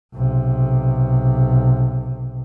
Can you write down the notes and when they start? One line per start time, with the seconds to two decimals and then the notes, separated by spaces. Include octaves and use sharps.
0.14 B1 C3